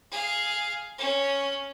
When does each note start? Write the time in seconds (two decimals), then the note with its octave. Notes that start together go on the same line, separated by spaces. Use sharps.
0.12 G#4 F5
0.98 C#4